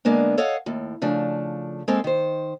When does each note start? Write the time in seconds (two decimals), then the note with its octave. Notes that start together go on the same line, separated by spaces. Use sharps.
0.05 D3 G#3 A#3 B3 D4
0.38 A4 C#5 D#5 F5 F#5
0.66 D#2 A2
1.02 C#3 F3 A3 D4
1.88 G#3 A#3 C4 A4 C5
2.04 D#3 C5